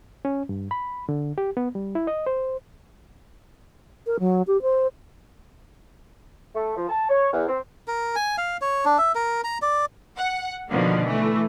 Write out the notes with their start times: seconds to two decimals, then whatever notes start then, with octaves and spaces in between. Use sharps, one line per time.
0.25 C#4
0.49 G2
0.71 B5
1.09 D3
1.38 G4
1.57 B3
1.75 G3
1.95 E4
2.07 D#5
2.26 C5
4.06 A#4
4.19 F#3
4.47 G4
4.62 C5
6.55 A3
6.76 F3
6.89 A5
7.09 C#5
7.33 E2
7.48 C4
7.88 A#4
8.16 G#5
8.38 F5
8.61 C#5
8.85 D4
8.98 E5
9.15 A#4
9.44 A#5
9.62 D5
10.18 F#5
10.69 B2 D3 D#3 F3 A#3
11.04 E3 A3